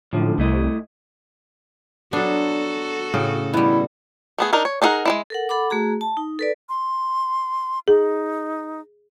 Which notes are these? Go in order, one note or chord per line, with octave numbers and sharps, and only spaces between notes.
F#2 A2 D3 F3
C2 A3 E4 D#5
F#3 B3 D4 F#4 A4
A2 C#3 G5
B2 G3 E4
A3 B3 G#4
D4 D#4 A#4
C#5
D4 D#4 G#4 A#4 F#5
G#3 D#4 E4
A4 A#4 F#5
A4 F#5 B5 D6
A3 F#4 G#4 A#5
A5
D#4
A4 B4 D5
C6
D#4 G#4